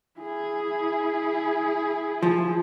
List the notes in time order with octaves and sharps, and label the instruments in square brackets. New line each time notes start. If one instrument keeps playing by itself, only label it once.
[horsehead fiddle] E4 G#4
[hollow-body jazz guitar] F3